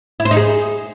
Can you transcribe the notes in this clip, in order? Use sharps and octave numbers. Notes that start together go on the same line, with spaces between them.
E4
C5
D#4
G#4